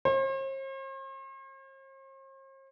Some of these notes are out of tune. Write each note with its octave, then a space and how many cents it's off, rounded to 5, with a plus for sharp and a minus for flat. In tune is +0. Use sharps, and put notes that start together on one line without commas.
C5 +45